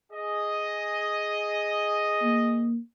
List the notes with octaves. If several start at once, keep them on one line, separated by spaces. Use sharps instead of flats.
G#4 D#5
A#3